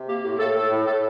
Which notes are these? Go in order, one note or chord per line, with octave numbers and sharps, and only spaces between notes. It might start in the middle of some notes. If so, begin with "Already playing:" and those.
Already playing: C3
A#3 G4
A2 G4
A2 A4
A2 A4
A2
A2 A4